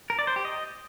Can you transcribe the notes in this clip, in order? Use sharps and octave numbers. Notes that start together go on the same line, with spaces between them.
A#4
D5
C5
G4
D#5